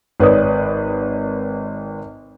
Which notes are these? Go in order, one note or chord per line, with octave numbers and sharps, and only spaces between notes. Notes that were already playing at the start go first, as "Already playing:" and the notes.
G#1 B4 C#5 D5 D#6